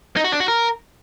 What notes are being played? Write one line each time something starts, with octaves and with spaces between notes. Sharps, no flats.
D#4
F#4
D4
F#4
A#4